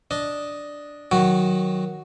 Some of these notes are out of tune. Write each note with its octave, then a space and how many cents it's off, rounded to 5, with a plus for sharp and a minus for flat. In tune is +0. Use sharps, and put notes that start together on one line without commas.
D4 +0 D#5 +0
D#3 +0 F#3 +0 F#4 +0